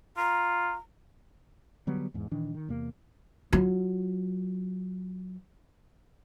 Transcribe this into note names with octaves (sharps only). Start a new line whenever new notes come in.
F4 A#5
D3 F#3 G3 B3
E2 G#2
A#2 D#3 E3 D4
D#3
E2 C3 A#3
F#3 F4